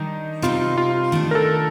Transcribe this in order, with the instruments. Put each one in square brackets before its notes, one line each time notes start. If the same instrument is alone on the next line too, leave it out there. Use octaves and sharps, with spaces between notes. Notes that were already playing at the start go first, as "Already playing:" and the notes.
Already playing: [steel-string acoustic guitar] D#3 G3 D4 [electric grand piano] D#4
[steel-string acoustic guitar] C3 G3 C4 D#4 [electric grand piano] F4
[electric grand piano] F4
[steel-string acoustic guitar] D#3 A3 D4
[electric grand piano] A#4
A4